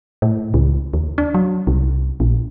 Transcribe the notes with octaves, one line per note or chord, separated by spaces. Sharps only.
A2
C#2
D#2
D4
F#3
C2
A#1